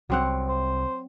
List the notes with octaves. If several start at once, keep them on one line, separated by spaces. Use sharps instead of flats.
C2 F#3 C4 F#5
C5